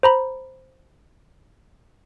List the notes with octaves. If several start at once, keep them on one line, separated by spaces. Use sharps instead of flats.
C5 A#5 B5